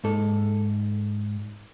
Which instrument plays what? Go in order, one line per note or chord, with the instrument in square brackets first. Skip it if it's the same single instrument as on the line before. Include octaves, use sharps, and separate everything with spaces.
[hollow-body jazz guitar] G#2 A4